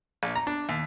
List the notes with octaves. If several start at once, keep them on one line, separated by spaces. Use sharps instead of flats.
A#1
A#5
D4
D#2